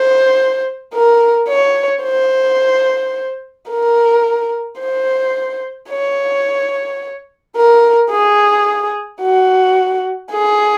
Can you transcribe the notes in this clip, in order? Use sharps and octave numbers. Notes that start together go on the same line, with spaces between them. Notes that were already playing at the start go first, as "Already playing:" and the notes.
Already playing: C5
A#4
C#5
C5
A#4
C5
C#5
A#4
G#4
F#4
G#4